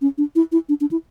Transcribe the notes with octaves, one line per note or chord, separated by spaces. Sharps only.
C#4
D4
E4
E4
D4
D4
E4